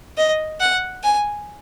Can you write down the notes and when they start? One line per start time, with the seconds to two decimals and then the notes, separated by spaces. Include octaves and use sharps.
0.17 D#5
0.60 F#5
1.03 G#5